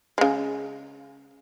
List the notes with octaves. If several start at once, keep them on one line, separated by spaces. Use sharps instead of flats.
C#3 G#3